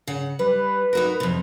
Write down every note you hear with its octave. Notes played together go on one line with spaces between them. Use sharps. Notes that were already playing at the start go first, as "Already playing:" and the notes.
C#3 F#5
G3 B4
D#4 F#4 A#4
F2 C3